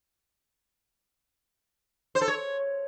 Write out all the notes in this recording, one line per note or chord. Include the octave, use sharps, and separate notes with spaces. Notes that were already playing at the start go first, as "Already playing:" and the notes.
C5
A4
C#5